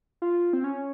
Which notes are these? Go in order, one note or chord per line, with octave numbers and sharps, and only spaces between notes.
F4
C4
C#4